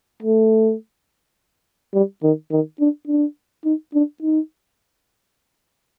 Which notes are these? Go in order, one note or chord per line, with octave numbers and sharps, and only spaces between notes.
A3
G3
D#3
D#3
D4
D4
D#4
D4
D#4